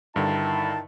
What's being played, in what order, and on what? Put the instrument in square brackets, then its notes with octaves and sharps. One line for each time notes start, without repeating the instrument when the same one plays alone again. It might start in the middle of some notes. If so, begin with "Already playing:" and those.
[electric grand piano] G2 D3 [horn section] D#3 E4 A5